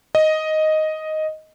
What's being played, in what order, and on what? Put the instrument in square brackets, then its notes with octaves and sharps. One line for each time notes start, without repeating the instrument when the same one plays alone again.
[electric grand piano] D#5